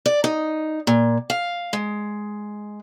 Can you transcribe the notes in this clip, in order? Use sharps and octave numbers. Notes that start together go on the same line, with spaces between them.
D5
D#4
A#2
F5
G#3